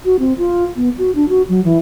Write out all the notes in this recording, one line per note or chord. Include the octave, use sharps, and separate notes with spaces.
F#4
C4
F4
B3
F#4
D4
F#4
F#3
E3